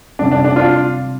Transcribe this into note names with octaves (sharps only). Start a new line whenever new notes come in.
C3 G3 C4 D4
D4
D4
D4 F4